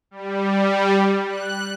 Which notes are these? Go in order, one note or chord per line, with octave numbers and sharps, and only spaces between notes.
G3
F#6